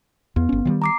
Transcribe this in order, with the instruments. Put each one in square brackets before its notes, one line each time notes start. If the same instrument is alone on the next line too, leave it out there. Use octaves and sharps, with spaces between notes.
[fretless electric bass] E2 [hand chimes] B3
[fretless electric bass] G1 C#4
D#3 F3 G3
[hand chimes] A#5 D6 C7